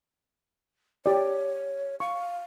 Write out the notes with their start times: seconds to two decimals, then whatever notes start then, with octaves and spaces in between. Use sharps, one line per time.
1.06 G4 C#5 D5
2.00 F5 C#6